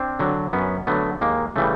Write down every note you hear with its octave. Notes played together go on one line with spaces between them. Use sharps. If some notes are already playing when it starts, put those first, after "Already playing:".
Already playing: C4 D4
D3 F#3
F#2 B3 C#4
D3 F#3 A3 B3
D#2 G#3 A#3
C#3 E3 G3 A3